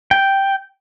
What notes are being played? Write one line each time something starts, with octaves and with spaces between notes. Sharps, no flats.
G5